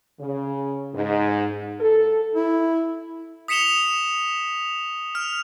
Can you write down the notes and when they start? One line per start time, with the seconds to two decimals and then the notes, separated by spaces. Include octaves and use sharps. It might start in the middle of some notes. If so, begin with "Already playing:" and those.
0.20 C#3
0.95 G#2
1.80 A4
2.35 E4
3.48 D#6 B6 C#7 E7 F7 G7
5.15 F6 F7